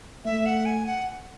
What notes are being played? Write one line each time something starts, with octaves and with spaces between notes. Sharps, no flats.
A3 E5
F#5
G#5
F#5